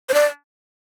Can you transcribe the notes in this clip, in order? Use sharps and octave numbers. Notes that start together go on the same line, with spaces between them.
C5
D5